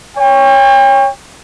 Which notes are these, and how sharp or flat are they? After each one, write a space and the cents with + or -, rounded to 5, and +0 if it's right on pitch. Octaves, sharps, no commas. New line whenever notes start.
C#5 +0 G5 +40